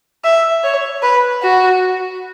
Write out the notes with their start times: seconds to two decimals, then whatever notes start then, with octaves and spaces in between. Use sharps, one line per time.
0.24 E5
0.63 C#5
1.02 B4
1.42 F#4